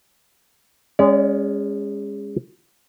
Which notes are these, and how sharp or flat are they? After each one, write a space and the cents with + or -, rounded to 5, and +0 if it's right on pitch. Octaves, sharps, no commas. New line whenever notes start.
G#3 -25 C#4 -5 D5 -45